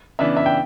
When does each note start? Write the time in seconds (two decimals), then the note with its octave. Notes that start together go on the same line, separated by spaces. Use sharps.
0.19 C#3 E3 B3 D4 E5
0.37 E5
0.46 G5